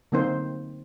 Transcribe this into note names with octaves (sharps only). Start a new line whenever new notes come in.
D3 F#3 A#3 C4 D#4 C5